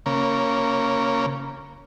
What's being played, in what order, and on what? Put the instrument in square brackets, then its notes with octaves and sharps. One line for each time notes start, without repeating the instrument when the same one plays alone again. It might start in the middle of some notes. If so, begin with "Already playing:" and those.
[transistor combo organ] C#3 A#3